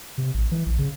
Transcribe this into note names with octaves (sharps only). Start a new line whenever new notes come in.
C3
A1
E3
A#1
C#3